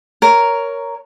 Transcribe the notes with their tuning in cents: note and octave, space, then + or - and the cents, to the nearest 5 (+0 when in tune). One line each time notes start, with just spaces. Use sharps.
A#4 +0 C#5 +10